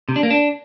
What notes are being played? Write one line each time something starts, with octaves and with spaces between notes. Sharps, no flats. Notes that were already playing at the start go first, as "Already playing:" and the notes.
C3
D4
A#3
D4